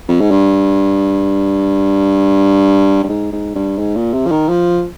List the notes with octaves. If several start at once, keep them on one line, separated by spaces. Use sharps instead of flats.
F2
G#2
G2
G2
G#2
G#2
G2
G#2
A#2
C3
F3
D#3
F3